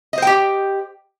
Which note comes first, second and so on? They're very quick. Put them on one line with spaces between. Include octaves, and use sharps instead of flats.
D#5 C5 G5 G4